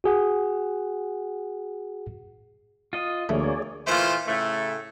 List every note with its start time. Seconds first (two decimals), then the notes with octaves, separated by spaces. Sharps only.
0.04 F#4 G#4 F#5
2.93 F4 D#5
3.29 D2 A3 A#3 G#4 C#5 D5
3.87 A#2 E3 A3 F4 C5
4.27 A2 C#3 A3